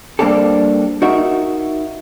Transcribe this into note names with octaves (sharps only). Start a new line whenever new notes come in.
G3 A#3 C4 D4 G4 A4
D#4 F#4 A#4 E5